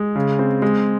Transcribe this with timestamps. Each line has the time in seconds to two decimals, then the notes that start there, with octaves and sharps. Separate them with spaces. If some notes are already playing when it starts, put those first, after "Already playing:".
Already playing: G#3
0.15 C#3
0.39 C4
0.62 G#3